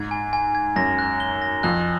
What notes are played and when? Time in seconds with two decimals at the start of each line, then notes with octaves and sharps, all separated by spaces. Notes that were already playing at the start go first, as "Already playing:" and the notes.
Already playing: G#2 G#6
0.11 G#5
0.33 G#5
0.55 G#6
0.76 F#2 A#6
0.99 F#6
1.20 G7
1.42 A#6
1.63 F2 F#6